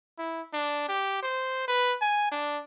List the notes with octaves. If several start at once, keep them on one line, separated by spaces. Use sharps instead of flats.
E4
D4
G4
C5
B4
G#5
D4